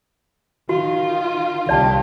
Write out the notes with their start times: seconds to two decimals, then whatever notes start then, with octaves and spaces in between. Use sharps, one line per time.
0.69 D#3 F4 F#4
1.69 C2 D#3 F4 G4 D5 A5